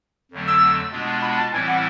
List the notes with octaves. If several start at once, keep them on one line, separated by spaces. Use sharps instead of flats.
F2 D3 F#3 A3 C4
E6
B2 G#3 B3 D4 F4
B5
A5
A2 E3 G3 C4 E4 G#5
F#5